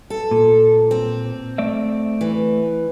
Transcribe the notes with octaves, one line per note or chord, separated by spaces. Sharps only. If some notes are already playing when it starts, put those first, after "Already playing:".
A4
A#2
C4
A3 D5 E5
E3